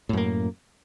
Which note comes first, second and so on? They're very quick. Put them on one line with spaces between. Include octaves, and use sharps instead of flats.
A2 F#2 A#3